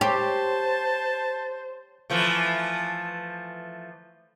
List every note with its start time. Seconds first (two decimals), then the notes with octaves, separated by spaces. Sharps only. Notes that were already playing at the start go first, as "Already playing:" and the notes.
0.01 G4 C5 C#5 A5 C6
2.10 E3 F3 A3